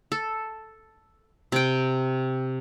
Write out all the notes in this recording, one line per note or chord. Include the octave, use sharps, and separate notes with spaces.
A4
C3 G5